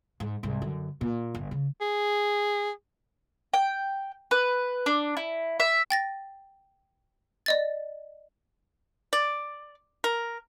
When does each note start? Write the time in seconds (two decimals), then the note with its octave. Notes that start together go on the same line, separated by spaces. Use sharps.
0.20 G#2
0.43 C2 G#2
0.62 F#2 D3
1.01 A#2
1.35 G1
1.51 C#3
1.81 G#4
3.54 G5
4.31 B4
4.86 D4
5.17 E4
5.60 E5
5.90 G5 A6 A#6
7.46 D5 D#5 A6
9.13 D5
10.04 A#4